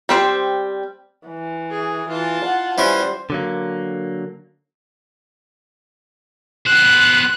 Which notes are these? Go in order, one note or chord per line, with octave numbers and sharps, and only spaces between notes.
G3 C4 C5
E3
G#4
E3 F4 A5
F#5
E3 G3 C#4 E4 C5
D3 F#3 A#3
B3 C5 F#6